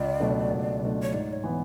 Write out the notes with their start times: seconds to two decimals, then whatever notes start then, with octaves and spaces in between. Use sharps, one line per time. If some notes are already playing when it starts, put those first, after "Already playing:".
Already playing: C#2 D5
0.20 B2 F#3 A3 D4
0.52 C#2
0.81 B2 F#3 A3 D4
1.03 C#5
1.13 G#2 D5
1.33 C#5
1.43 E3 B3